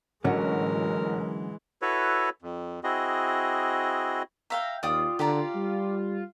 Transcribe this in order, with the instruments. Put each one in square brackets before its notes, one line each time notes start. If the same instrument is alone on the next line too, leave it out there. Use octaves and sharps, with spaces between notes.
[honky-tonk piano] A1 F#4 [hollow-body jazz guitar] D3 F#3 C#4 [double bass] E3 G#3 [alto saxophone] A#4
[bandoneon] E4 F#4 A4 B4 C#5
F2
C4 E4 F#4 G#4 D#5
[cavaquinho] E5 F5 G5 [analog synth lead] A#5
[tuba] D#2 [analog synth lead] F4 [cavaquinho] D5 G5 D#6
[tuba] D3 [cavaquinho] G4 D5 A#5
[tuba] G3